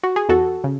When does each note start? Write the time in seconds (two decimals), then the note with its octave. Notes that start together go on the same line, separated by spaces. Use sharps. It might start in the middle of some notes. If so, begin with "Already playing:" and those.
0.03 F#4
0.16 G#4
0.29 E2 F#4 A4
0.64 C#3